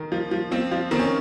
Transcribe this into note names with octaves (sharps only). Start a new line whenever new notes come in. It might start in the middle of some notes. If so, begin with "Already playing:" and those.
Already playing: D#3
F3
F3
F3 C4
F3
D#3 C4
C#4